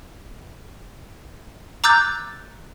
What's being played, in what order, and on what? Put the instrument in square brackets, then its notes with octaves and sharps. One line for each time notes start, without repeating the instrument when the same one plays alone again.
[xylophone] A#5 D6 E6 F#6 G6 A6